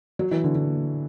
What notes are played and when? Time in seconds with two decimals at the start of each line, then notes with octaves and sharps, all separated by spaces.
0.19 F#3
0.31 E3
0.44 D3
0.55 D3